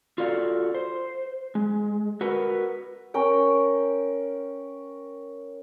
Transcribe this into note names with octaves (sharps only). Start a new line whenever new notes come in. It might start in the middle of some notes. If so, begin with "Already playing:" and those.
F4 F#4 A4 D5 F5
C5
G#3
F#4 A#4 B4
C#4 A#4 G5